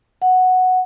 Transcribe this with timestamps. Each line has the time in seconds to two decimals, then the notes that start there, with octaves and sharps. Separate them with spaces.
0.22 F#5